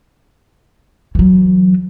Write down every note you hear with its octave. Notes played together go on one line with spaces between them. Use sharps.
E3 F#3